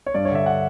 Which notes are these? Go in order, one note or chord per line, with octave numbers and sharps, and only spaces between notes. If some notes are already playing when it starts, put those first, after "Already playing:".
C#5
G2 D5
C#5
D3 E5
F#5